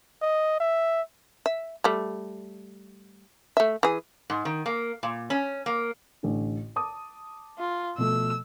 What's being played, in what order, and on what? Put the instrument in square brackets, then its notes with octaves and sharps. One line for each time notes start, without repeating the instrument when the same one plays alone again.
[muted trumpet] D#5
E5
[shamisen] E5
G3 A3
A3 E5
E3 G#4
[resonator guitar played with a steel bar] G#2
D#3
A#3
A#2
C#4
A#3
[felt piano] A1 D3
A5 D6 D#6
[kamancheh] F4
[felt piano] B2 F3 A3 [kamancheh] E6